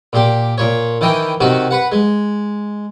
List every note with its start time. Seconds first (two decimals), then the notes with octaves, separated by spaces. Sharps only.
0.13 A#2 G4
0.58 A#2 C#5
1.01 D#3 E3 D#5 G5
1.41 C3 D#3 F#4
1.71 B4 F#5
1.92 G#3